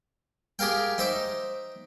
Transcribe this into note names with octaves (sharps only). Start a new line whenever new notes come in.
G4 G#4 A#4 F5 G5
D#4 C5 E5 D6